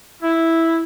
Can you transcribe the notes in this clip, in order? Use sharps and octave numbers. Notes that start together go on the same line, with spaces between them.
E4